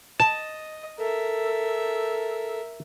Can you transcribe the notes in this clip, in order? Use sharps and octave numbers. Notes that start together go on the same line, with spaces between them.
D#5 A5
A4 A#4 E5